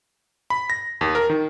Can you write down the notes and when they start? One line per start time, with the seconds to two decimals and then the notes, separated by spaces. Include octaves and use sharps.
0.50 B5
0.70 A#6
1.01 D#2
1.15 A#4
1.30 D#3